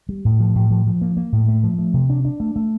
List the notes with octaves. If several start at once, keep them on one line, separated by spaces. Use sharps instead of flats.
G3
A2
F3
A2
F3
F3
A#3
A#3
A2
A3
F3
A3
C3
D4
D4
A3
A3